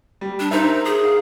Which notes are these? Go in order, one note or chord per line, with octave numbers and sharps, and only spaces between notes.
G3
D4
D#4 A#4 C5 E5
G#4
F5